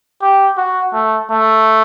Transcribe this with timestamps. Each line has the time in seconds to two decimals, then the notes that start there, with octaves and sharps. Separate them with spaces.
0.22 G4
0.57 F#4
0.93 A3
1.30 A3